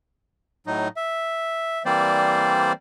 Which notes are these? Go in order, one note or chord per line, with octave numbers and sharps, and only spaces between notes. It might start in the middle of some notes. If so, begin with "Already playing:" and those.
A2 F#3 D#4
E5
E3 G3 A#3 C4 C5 D5